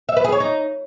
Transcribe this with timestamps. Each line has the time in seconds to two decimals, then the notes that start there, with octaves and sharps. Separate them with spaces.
0.09 E5
0.17 B4
0.24 G#4
0.32 C#5
0.40 D#4